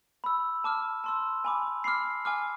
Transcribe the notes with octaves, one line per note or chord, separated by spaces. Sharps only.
B5 E6
A5 D6 F6
A5 C6 E6
G#5 B5 D6
B5 D6 F6 C7
G#5 D6 F6